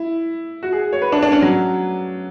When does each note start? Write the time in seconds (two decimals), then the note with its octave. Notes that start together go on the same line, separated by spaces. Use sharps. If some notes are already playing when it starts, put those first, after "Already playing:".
Already playing: E4
0.63 F#4
0.73 G#4
0.93 C#5
1.02 B4
1.12 D4
1.23 D4
1.32 C#4
1.42 F#3